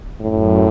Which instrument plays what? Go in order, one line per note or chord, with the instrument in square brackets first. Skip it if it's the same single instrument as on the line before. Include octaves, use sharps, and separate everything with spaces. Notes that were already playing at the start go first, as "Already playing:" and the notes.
[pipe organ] F#2 [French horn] A2